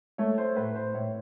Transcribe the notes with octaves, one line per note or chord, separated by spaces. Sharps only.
A3 C#5
C5
A2 B4
C5
A2 C#5